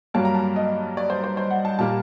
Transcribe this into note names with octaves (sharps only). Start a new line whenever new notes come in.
G2 F#3 A#3 A5
A#5
A5
D#5
D5
C5
C5
C5
F#5
A5
A#2 G3 A#3 A5